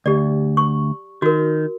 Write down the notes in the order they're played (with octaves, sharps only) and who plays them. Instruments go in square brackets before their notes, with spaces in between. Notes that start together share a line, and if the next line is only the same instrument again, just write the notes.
[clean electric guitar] D2 [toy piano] G4 D5
[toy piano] C#6
[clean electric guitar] D#3 [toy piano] F#4 A#4